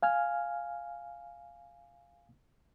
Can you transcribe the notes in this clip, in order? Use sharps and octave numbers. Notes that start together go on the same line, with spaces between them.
F5 G#5 F6